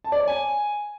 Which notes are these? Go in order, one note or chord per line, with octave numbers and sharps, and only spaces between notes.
A5
D5
C#5
G#5